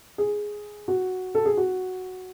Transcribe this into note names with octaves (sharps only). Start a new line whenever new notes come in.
G#4
F#4
A4
G#4
F#4